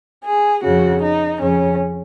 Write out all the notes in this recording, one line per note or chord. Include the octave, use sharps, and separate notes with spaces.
G#4
F2 C#3 F#4
D#4
F2 C#3 C#4